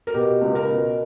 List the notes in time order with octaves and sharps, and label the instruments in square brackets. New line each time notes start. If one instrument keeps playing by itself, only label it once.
[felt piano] A#4
B2 G4
C#2
A#4
B2